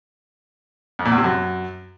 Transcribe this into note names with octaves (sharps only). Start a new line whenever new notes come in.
F2
A#2
E2
C3
F#2